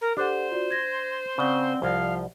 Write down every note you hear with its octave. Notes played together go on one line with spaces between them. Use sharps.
A#4
D4 G4 A4 C5 F#5
F4 F#4 D5
G#6 A#6
C#3 C4 D5 F#5 G7
C2 F3 F5